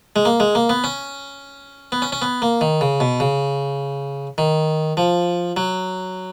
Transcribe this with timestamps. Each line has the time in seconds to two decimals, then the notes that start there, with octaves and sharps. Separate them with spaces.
0.16 G#3
0.25 A#3
0.40 G#3
0.55 A#3
0.69 B3
0.84 C#4
1.92 B3
2.02 C#4
2.12 C#4
2.22 B3
2.42 A#3
2.61 D#3
2.81 C#3
3.00 B2
3.20 C#3
4.38 D#3
4.97 F3
5.57 F#3